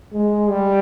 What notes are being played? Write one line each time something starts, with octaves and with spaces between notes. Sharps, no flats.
G#3
G3